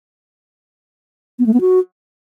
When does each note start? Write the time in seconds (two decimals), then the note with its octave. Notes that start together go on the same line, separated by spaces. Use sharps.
1.39 B3
1.46 A3
1.54 B3
1.61 F#4